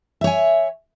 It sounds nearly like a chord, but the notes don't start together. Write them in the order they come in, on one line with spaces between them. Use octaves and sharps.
E5 C#5 G#5